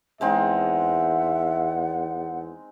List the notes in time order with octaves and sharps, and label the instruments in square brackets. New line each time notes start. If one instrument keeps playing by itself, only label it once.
[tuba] E2 [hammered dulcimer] G#3 C4 D#4 [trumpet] E5 [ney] F#5